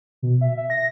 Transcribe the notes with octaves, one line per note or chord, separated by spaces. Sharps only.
B2
E5
E5
A#6